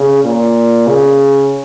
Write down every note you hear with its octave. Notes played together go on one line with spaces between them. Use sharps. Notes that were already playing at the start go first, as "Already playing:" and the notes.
Already playing: C#3
A#2
C#3